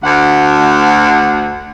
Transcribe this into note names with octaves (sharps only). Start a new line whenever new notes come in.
D2 F#5